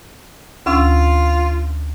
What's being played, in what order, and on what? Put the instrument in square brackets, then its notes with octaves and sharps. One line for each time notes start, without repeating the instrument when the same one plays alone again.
[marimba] D2 C#4 E6 [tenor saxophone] F4